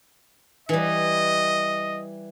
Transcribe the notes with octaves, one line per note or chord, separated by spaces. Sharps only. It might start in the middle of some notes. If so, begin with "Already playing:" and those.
E3 G3 D#5